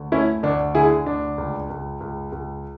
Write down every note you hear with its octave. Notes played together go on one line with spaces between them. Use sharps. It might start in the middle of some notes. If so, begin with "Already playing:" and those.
Already playing: D2
A3 C#4 E4
D2 D4
D3 E4 G#4
D2 D4
C#2
C#2
C#2
C#2